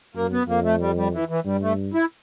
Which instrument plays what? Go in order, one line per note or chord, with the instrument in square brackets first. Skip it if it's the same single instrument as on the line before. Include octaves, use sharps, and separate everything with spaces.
[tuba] F#2 [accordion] A#3
[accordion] B3
[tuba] F2 [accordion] A#3
[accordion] A3
G3
G3
E3
E3
[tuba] G2 [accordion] G3
[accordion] A3
E4